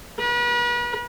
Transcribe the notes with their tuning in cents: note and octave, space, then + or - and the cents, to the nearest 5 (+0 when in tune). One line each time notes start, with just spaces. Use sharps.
B4 -40